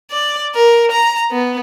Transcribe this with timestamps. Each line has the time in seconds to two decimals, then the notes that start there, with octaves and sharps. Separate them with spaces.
0.12 D5
0.55 A#4
0.91 A#5
1.31 B3